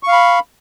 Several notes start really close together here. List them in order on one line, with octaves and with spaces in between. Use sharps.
C#6 F5 B5